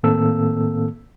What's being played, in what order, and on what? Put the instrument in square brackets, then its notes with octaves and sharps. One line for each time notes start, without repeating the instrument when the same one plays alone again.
[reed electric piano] A2 D#3 A#3 C4 A4 E6